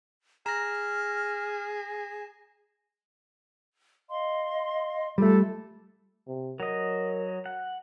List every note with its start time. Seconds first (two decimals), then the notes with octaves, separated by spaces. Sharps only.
0.46 G#4 A#5 F6 A#6 E7
4.09 D#5 F5 C6
5.18 G3 A3 F4 A4
6.28 C3
6.60 F#3 A#4 D#5
7.46 F#5